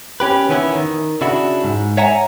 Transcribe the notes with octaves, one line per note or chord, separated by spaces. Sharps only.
C#4 G4 B4
D#3 E3 B3 C#4 E4
D#3
C#3 D4 E4 F#4
G#2
C#5 E5 F#5 G#5 A#5